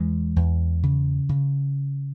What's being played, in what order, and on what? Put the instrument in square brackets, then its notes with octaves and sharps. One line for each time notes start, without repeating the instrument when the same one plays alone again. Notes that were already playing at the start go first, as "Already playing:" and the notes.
Already playing: [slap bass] E2 E3 G#3
E2
C#3
C#3